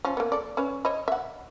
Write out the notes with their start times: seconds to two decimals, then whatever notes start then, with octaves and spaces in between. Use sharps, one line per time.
0.05 F3 C#4
0.17 A#3 B3
0.32 A4 D5
0.57 C#4 B4 C#5
0.85 C#5 D#5 B5
1.08 E5 F#5